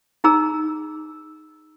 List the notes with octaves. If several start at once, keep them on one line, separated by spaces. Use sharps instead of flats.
D#4 G#4 A#5 E6